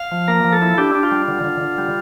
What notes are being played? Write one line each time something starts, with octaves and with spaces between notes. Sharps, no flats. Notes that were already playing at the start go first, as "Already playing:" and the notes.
Already playing: F5
F3
A#3 A#4
F3
A4
E4
D4 G4
D4
F4
G3
D3
D3
D3
G3